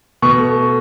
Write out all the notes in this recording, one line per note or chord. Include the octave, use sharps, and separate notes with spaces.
B2 C#6
A3
A3